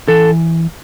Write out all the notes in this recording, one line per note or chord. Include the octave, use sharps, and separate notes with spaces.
E3 A4